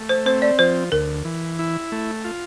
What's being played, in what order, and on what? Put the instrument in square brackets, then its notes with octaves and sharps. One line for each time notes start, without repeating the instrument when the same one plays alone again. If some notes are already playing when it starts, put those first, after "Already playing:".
Already playing: [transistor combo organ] A3
[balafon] C5
[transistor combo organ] C4 [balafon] C5
[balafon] D5
[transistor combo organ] F3 [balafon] C5
[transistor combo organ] D2 [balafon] A#4
[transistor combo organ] E3
E4
A3
F4